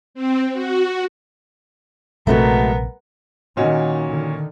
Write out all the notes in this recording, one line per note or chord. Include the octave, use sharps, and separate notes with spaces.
C4
F#4
A#1 C3 F#3 G#3 A3 B3 C4 A#4
A#2 D#3 C#4 D#4 F#4 D#5
D3 D#3